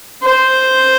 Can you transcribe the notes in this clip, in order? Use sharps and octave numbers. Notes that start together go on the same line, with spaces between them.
C5